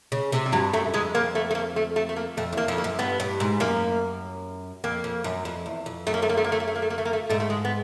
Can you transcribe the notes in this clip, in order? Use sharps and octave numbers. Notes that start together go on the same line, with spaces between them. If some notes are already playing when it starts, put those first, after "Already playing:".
C#3
C3
G3
G2 F#3
F#2 A3
F2 G#3
F2 A#3
A3
A3
A#3
A3
A3
A3
A#3
F2 A3
E2 A#3
F2
A#3
F#2
G2 B3
G2
G#2
F#2 A#3
F2 A#3
F2
F#2
F2
E2
F2
F#2 A3
A#3
A3
A#3
A3
A#3
A3
A#3
A3
A#3
A3
A#3
A3
A#3
A3
G#2 A3
A3
G#3
B3